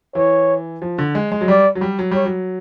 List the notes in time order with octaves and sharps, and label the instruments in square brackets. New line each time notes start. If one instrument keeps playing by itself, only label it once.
[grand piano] E3 [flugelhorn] C#5
[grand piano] F3
D3
G#3
G#3
F#3
[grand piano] G3 [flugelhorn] D5
[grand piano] F#3
G3
F#3
[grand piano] G3 [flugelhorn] C#5
[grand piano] F#3